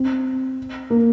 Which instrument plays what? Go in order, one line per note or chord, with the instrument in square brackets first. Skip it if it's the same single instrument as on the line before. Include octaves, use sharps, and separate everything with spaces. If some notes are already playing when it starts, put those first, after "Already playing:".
Already playing: [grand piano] C4
A#3